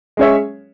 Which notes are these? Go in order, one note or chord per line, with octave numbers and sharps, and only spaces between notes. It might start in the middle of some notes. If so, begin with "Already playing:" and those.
G#3 C#4 G#4 C#5 E5